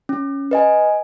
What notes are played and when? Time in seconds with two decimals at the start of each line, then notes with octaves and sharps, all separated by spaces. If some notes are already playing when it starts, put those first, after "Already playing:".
0.09 C#4
0.51 B4 D#5 G#5